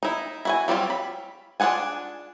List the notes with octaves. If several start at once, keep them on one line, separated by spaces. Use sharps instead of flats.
D#4 E4
E4 F#4 G#5
F#3 G3 C4 F4
B5
D4 F4 G#4 F#5 G#5